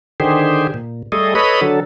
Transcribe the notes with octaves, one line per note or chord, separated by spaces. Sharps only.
D3 D#3 G4 G#4 C5
A#2
G3 A3 G#4 A4 D#5
A4 B4 C#5 D#5 B5
D3 F#3 A4